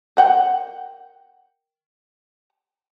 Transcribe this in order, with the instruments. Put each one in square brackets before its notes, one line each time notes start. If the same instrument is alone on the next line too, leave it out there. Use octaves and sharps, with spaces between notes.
[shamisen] A#4 F#5 G5